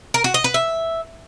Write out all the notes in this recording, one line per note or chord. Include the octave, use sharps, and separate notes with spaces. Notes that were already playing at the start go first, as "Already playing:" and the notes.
A#4
F#4
D#5
B4
E5